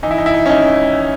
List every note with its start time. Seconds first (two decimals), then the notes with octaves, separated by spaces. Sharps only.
0.03 E3 D#4
0.11 E4
0.18 D#4
0.26 E4
0.34 D#4
0.46 C#4
0.50 G#1 D#4